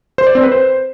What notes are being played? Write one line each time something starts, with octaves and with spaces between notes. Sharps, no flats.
C5
D5
C4
B4
C5